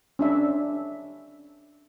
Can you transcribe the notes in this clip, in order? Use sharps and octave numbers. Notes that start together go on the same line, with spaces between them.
C#4 D4 E5